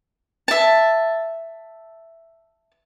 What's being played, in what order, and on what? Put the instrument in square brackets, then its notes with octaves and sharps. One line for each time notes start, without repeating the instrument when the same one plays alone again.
[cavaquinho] E5 A5